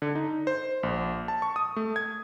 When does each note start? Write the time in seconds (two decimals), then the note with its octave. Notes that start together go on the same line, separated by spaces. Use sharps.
0.02 D3
0.15 D#4
0.47 C5
0.83 A#1
1.28 A5
1.42 C#6
1.56 D#6
1.76 A3
1.96 G#6